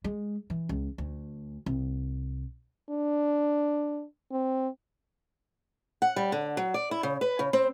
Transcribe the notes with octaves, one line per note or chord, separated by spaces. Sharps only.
G#3
E3
C#2
D2
C2
D4
C4
F#5
G3
D3
F#3
D5
E4
C#3
B4
C#3
C4